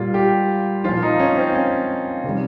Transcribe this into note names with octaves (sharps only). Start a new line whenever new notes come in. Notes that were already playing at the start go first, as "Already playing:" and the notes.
Already playing: A#2 G3 F4
G4
A#2 F3 F4
D#4
C#4
C4
C#4
C3 D#3 G3